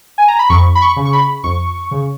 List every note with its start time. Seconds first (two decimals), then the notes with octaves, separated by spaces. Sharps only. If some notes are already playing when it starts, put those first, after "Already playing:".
0.18 G#5
0.28 A#5
0.39 B5
0.50 F2 C#6
0.75 B5
0.82 C#6
0.96 C#3
1.05 C#6
1.13 B5
1.44 F2 C#6
1.91 C#3